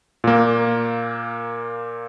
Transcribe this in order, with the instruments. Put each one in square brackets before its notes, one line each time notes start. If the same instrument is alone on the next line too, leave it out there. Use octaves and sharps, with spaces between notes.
[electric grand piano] A#2 A#3